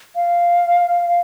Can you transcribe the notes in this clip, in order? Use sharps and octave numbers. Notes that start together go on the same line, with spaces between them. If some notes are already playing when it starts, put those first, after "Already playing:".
F5